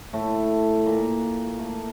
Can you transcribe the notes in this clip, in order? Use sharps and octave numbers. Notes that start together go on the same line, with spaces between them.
A2 A3
A#2 A#3
A3
A#3